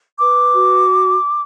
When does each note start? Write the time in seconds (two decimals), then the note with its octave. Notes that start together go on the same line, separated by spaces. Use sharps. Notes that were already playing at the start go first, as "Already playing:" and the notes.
0.19 B4 D6
0.53 F#4